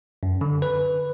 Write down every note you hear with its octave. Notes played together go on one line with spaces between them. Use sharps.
F#2
D3
B4